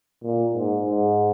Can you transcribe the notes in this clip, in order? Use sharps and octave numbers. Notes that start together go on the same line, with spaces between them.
A#2
G#2
G#2